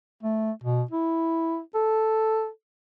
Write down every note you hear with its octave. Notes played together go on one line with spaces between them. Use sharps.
A3
B2
E4
A4